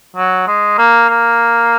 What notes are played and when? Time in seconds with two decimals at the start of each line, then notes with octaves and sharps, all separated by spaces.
0.16 F#3
0.47 G#3
0.78 A#3
1.09 A#3